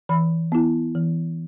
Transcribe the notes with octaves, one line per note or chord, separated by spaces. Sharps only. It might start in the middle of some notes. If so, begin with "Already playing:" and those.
E3 B5
B3 E4
E3